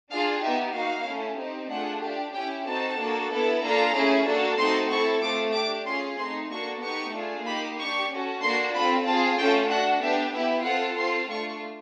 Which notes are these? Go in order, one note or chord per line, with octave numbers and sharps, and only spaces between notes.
D4 F4 G#4 F5
B3 D#4 G4 E5
A#3 D#4 F#4 F5
A3 C#4 E4
C4 D#4 G4
A3 D4 F4 G#4 F#5
D4 G4
C#4 E4 G4 G5
C4 D#4 F#4 A4 A5
A#3 D4 F#4 A4
B3 E4 A4
A#3 D4 F4 A4 A#5
A3 C#4 E4 G#4
A#3 D4 F#4 A4
A3 C4 D#4 F#4 A4 C6
C4 E4 A4 C#6
A3 C4 F4 D6
D4 G4 D6
C#4 F4 G#4 C6
A3 C4 D#4 C6
A#3 D4 F#4 A4 C#6
B3 D#4 G4 C#6
A3 D4 F4 G#4
A#3 D#4 G4 B5
D4 G4 C#6
C#4 F#4 A4
A#3 D4 F#4 C6
C4 F4 A4 B5
C4 F4 G#4 A5
A3 C#4 F4 A4 G5
D4 F#4 A4 F#5
B3 D4 G4 E5
B3 E4 G4 E5
C4 F4 A4 F#5
C4 F4 A4 C6
A3 D4 F4 C#6